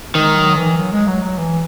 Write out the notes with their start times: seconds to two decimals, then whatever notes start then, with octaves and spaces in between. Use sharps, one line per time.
0.15 D#3 G#3
0.36 F#3
0.56 E3
0.77 F#3
0.92 G#3
1.07 F#3
1.23 F#3
1.38 E3